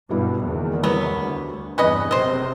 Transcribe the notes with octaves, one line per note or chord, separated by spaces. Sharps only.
G2 B2 B3 E4 F#4
F#1 E2 D#3
C2 F#3 B3 A#4
D2
E2 G2 C3 C#4 B4 D#5 F#6
F#1 C3 C4 C5 D#5